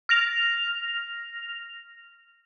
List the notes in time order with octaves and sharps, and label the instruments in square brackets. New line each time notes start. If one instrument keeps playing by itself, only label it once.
[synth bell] F6 A#6 F7